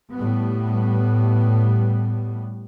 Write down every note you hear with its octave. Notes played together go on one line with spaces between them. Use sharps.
A2 G3 B3